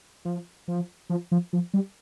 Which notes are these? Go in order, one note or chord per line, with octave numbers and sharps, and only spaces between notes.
F3
F3
F3
F3
F3
G3